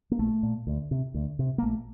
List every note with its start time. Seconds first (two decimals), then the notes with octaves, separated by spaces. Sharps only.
0.11 A#3
0.19 A#1 A3
0.43 A#2
0.67 D2
0.91 C3
1.14 D2
1.39 C3
1.58 A#3
1.63 A#1 A3